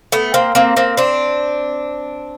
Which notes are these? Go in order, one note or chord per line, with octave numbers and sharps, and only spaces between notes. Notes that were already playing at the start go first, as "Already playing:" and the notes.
A3 B3
A#3 C4
A#3 C4
A#3 C4
C4 D4